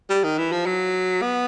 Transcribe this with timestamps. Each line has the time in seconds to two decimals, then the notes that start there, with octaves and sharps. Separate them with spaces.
0.10 G3
0.24 D#3
0.38 E3
0.52 F3
0.66 F#3
1.22 B3